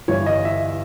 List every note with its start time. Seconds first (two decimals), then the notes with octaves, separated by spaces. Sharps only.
0.08 G1 G2 E3 G3 C#5
0.26 D#5
0.45 E5